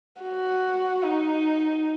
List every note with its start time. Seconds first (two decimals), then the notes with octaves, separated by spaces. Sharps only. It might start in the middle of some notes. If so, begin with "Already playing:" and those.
0.22 F#4
1.03 D#4